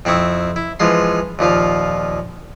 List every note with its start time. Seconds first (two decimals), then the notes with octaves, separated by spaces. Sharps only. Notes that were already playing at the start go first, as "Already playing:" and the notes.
0.05 F2 C4 E4 C#6 D#6
0.56 E4
0.80 E3 F3 G#3 C6
1.39 D#2 A#2 F3 F5